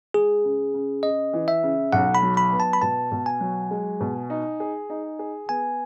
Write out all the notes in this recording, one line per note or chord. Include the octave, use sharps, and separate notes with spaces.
G#3 G#4
C#3
C#3
C#3 D#5
E3
E5
C#3
B1 F#5
B5
F#3
B5
B3
A5
B5
B2 A5
B2
G#5
F#3
G#3
B2
D#4
G#4
D#4
G#4
B3 G#5